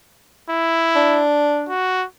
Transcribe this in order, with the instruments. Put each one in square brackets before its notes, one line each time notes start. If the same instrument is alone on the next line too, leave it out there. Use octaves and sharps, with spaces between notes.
[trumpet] E4
[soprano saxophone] D4
[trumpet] F#4